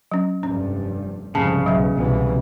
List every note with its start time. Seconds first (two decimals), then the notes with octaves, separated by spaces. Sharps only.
0.12 F#3 C#4
0.43 F1 G2 C#4
1.35 C2 F2 G#2 C#3 A5
1.66 B1 E2 F#3 E5
1.97 C2 B2 E3